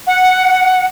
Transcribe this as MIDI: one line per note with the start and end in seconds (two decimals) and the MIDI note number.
0.08 0.84 78